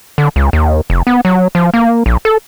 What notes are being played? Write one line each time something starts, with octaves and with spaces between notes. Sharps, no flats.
D3
C#2
D#2
F1
B3
F#3
F3
A#3
A#1
A4